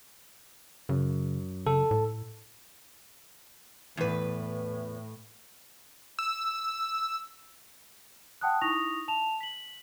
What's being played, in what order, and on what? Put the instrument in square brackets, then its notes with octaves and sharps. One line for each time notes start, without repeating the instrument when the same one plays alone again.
[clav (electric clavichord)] F#2 [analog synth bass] C#3
[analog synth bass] C#3 [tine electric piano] A4
[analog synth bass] A2
[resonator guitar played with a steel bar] E2 B4 [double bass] A2
[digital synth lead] E6
[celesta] F#5 G5 A5 D#6 F#6
D#4 E4 C#6 D#6 A#6 F7
A5 E7 F7
B6 F#7